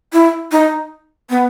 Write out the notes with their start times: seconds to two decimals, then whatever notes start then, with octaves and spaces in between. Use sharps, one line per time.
0.13 E4
0.52 D#4
1.30 B3